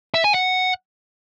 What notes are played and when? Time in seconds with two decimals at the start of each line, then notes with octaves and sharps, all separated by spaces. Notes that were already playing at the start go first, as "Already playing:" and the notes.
0.14 E5
0.24 G#5
0.34 F#5